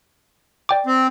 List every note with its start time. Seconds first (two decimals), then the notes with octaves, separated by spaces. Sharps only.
0.69 D5 G5 D6
0.86 C4